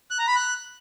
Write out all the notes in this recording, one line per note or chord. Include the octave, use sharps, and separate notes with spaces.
F#6
A#5
B5
F#6